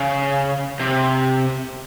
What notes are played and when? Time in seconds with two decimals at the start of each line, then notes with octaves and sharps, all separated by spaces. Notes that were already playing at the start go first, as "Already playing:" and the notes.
Already playing: C#3
0.80 C3